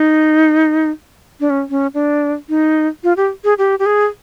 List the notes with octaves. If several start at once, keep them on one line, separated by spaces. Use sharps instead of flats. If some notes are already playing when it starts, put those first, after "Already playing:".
Already playing: D#4
D4
C#4
C#4
D4
D#4
F4
G4
G#4
G4
G4
G#4